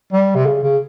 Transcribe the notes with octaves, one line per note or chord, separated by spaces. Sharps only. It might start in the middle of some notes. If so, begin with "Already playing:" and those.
G3
C3
C#3
C#3